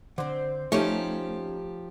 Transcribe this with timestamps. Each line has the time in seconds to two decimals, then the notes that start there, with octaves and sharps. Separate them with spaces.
0.18 D3 C4 C5
0.72 F3 A3 C#4 D#4 G4 C#5